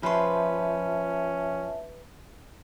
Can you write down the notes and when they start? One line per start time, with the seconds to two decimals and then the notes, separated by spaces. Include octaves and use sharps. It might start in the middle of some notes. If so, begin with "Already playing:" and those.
0.03 F3 C#4 B4 E5 A5 C6